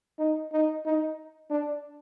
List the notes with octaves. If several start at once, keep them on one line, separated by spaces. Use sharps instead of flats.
D#4
D#4
D#4
D4